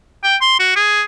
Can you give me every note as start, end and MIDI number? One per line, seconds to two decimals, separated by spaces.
0.24 0.36 79
0.41 0.59 84
0.60 0.72 66
0.76 1.03 68